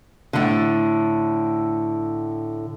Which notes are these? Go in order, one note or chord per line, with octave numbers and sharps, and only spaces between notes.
A2 D3